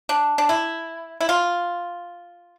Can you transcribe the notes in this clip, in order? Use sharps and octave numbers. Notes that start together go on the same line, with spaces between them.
D4
D4
E4
E4
F4